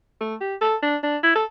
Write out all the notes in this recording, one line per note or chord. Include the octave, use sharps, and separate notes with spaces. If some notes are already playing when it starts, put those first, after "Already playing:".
A3
G4
A4
D4
D4
E4
A4